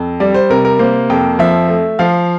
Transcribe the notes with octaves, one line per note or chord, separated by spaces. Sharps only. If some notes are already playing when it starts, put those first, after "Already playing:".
Already playing: F2
G3 D5
C5
C3 A#4
A#4
A#3 C5
F2 G5
F3 E5
A3
F3 F5